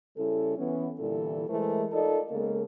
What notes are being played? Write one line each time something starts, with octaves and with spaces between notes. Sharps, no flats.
C#3 G3 C#4 E4 A4
E3 B3 C#4
A#2 D3 E3 G3 E4 A4
E3 G#3 A3 E4 A#4 C5
D#4 F4 A4 A#4 D5 D#5
C#3 G#3 A#3 B3 A4 A#4